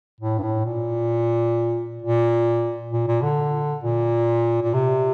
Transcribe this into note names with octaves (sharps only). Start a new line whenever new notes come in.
A2
G2
A2
A#2
A#2
A#2
A#2
D3
A#2
A#2
C3